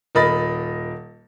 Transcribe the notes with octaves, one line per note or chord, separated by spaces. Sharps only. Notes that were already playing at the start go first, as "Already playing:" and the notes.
D#1 A#4 D#5 B5 A6